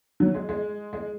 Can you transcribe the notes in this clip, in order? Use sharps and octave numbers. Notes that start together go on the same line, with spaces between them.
F#3
G#3
G#3
G#3